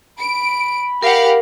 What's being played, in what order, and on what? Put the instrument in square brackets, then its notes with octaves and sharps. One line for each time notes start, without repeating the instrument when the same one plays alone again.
[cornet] B5 [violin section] D7
[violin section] G4 F5 F#5 [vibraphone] A#4